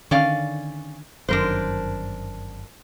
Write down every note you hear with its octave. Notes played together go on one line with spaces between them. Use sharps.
D3 D#3 C#4 D5 F5
G1 F#2 D#3 D4 A#4 C5